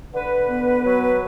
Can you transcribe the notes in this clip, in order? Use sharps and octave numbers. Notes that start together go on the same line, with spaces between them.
D3 B4
B3
F#3